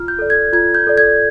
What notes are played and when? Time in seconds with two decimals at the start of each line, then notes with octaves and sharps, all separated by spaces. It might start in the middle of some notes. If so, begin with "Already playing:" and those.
Already playing: F4 F6
0.08 G6
0.19 A4 D5
0.30 G#6
0.53 F4 G#6
0.75 G6
0.87 A4 D5
0.98 G#6